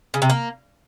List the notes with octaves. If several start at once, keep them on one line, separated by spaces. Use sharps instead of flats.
C#3
C3
A#3